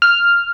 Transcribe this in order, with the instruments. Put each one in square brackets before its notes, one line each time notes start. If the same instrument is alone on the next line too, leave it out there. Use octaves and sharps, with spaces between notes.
[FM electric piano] F6